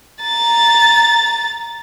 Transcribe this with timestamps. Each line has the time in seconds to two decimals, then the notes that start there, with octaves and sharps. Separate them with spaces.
0.22 A#5 A6